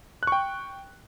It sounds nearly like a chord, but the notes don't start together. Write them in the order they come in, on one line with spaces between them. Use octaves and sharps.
F#6 C#6 G5